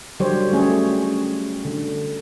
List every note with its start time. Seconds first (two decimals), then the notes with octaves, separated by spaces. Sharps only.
0.20 D3 F#3 G3 G4 C5 C#5
0.52 A3 C#4 G#4 C#5
1.65 D3